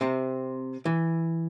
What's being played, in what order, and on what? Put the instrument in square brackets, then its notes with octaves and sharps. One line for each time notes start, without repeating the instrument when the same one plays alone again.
[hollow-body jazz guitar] C3 C4
E3